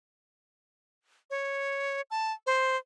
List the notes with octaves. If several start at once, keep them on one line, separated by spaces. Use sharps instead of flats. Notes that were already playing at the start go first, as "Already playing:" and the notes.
C#5
A5
C5